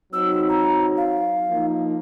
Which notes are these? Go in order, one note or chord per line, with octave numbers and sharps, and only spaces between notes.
F#3 C4 D#4 E6
A#5
F5
F3 A#3 D#4